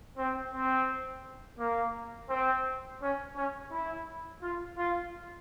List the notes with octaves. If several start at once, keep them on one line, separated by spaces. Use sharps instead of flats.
C4
C4
A#3
C4
C#4
C#4
E4
F4
F4